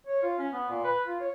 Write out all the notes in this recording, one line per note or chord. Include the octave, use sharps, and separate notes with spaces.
C#5
F4
C#4
B3
A#2
B4
F4
C#5